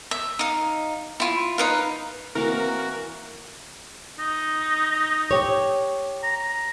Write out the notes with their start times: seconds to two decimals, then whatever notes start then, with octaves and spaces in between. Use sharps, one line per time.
0.11 E5
0.39 D#4 F5
1.20 E4 F4
1.58 D#4 B4 F5
2.35 E3 A#3 C4 F#4 A#4 F5
4.19 D#4
5.31 G4 C#5
6.23 A#5